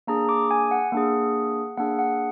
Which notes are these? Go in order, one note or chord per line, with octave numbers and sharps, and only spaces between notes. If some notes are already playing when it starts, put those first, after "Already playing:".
A#3 D4 G#4 A#5
D6
G#5
F#5
A#3 D4 G#4
A#3 D4 G#4 F#5
F#5